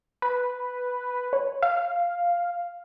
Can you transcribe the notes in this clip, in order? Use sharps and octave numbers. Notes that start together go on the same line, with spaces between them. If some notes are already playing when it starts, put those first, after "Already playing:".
B4
C#5
F5